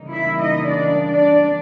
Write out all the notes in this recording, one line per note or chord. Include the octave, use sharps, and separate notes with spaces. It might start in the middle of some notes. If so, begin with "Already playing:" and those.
Already playing: C#3 E3 G3 A#3 D#4
E4 E5
D#4 D#5
D4 D5
D4 D5